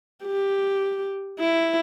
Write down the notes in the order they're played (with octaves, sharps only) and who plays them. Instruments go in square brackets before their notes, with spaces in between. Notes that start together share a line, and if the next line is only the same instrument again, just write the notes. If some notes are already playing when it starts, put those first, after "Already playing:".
[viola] G4
E4